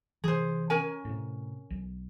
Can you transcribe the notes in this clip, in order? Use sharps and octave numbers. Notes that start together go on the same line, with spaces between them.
C3 E3 G#4 C5
C#4 A#4 G#5
A2 C3
B1